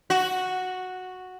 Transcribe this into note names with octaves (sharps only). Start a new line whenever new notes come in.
F#4